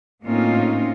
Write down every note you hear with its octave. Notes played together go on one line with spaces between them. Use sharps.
A2 A#3 C4 C#4 D#4 F4